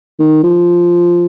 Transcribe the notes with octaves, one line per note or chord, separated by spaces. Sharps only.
D#3
F3